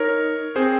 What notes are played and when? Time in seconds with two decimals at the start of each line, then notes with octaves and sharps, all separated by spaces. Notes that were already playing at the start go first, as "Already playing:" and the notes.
Already playing: D#4 A#4 C#5
0.56 C4 G#4 C5